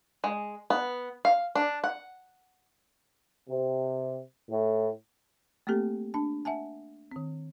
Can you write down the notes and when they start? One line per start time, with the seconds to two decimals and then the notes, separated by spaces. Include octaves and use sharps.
0.24 G#3
0.70 B3
1.25 F5
1.55 D4
1.84 F#5
3.48 C3
4.48 A2
5.67 A3 A#3 C4 G4 A4
6.14 D4 A5
6.45 E5 F#5 G#5 A5
7.11 D#3 C4